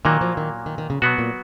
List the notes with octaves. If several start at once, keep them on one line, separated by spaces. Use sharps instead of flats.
A#2 D#3 F#3 A#3
F3
D#3
D#3
D#3
C#3
B2 F#3 B3 F#4
A#2